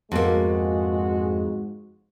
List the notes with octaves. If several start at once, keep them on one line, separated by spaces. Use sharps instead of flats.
F2 G#2 G#3 A#3 F#4